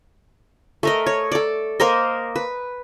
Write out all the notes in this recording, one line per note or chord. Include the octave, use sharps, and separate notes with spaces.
A3 A#4 D#5
C#5
A4 D5
A#3 A#4 C5 D#5
B4